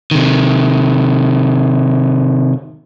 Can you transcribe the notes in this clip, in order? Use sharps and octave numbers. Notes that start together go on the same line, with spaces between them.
C3 D#3